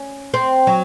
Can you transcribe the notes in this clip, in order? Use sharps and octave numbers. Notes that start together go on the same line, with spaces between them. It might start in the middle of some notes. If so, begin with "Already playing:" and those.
Already playing: C#4
C4
F#3